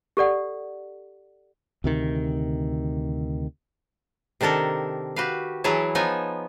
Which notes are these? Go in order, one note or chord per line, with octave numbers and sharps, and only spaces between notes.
G4 A4 D5 F#5
D2 C3 D#3
C3 D#3 D4 A4 A#4
F#4 G4 B4 F5
E3 F#3 E4 G#4 C#5 A5
F3 B3 D#4 C#5 G#5